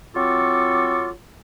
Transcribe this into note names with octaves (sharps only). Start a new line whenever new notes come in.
F#3 C4 F4 A4 C#6 D6